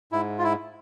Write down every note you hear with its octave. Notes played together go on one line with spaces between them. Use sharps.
G#2 E4
F4
E4